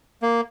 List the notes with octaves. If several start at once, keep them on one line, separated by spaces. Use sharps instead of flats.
A#3